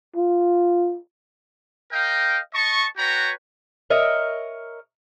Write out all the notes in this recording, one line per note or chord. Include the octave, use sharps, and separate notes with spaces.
F4
A#4 D#5 F5 G5
D#5 A5 C#6
F#4 B4 C#5 G5 A#5
A#4 C#5 D#5 E5